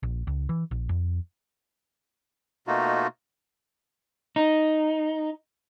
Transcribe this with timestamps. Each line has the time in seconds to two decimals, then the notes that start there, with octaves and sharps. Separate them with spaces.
0.03 A#1
0.27 C#2
0.49 E3
0.71 A#1
0.89 F2
2.67 B2 A3 A#3 D#4 F4 F#4
4.36 D#4